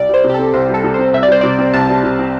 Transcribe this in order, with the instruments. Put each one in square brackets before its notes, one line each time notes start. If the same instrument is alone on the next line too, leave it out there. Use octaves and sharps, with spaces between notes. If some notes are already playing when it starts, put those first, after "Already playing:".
Already playing: [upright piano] C2 [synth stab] D5
[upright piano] G3 [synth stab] C5
[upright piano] C3
[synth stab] G4
[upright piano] C4 [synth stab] A4
[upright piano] C2 [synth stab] C5
[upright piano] G3
[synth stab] A4
[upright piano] C3
[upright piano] C4 [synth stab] C5
[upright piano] C2 [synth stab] E5
[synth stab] D5
[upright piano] G3 [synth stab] C5
[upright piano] C3 [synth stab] D5
[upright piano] C4
[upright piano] C2 [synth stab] A5
[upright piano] G3
C3
C4